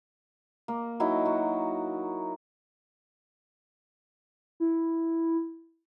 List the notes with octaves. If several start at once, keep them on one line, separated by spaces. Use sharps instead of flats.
A#3
F#3 D#4 E4
F#4
E4